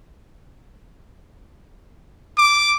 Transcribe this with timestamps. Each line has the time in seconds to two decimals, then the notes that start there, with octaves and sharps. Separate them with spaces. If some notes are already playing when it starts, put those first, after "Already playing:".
2.38 D6